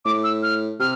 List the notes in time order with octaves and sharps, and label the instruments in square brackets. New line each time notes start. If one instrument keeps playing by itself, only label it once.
[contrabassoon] A2 [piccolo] D6
[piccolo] E6
F6
[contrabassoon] C3 [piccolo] F6